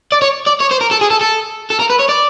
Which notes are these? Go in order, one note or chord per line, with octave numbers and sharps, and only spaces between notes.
D5
C#5
D5
C#5
C5
A#4
A4
G#4
A4
A4
A4
A#4
B4
C#5
D5